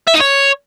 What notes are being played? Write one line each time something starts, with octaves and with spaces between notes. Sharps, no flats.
E5
D#4
C#5